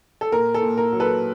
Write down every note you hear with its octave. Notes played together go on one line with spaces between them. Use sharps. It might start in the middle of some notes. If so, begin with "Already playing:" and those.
A4
A#2 A#4
A4
A#2
A#4
F#3
A4 B4